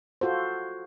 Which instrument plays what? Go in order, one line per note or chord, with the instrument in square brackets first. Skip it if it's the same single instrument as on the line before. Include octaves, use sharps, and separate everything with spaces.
[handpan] F4 F#4 A4 C5